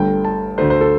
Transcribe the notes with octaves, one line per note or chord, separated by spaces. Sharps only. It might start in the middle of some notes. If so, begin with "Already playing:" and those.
Already playing: G1 G2 D3 A3 G5
A5
D2 D3 A3 C5
C5
A4